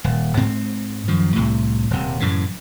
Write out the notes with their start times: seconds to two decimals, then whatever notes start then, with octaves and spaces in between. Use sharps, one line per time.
0.04 D#1
0.37 G#2 C4
1.08 F#2 D#3 F3
1.36 C2 A2 C3
1.91 D#1 C3
2.20 F#2 A2 C#3 E3